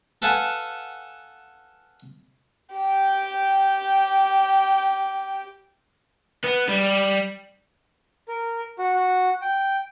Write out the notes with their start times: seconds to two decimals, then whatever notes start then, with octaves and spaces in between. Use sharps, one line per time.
0.22 A4 B4 F5 F#5 G#5 A5
2.75 G4 G5
6.44 B3
6.69 G3
8.28 A#4
8.79 F#4
8.95 F#4
9.42 G5